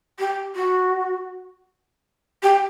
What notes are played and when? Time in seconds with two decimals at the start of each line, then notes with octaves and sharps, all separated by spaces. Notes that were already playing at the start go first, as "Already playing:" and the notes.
0.19 G4
0.55 F#4
2.42 G4